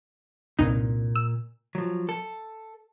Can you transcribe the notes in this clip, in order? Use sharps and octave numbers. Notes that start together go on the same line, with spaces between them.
C2 G2 A#2 D#4
E6
F3 F#3
A4